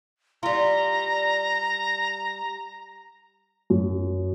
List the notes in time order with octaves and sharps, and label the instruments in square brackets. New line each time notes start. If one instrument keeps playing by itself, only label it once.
[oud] G3 F4 [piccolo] A#5
[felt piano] F#2